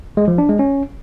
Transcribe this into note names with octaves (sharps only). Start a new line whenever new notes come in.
G#3
F3
D4
G#3
C#4